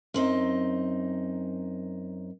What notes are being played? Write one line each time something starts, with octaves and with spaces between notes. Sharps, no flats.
F#2 C4 D#4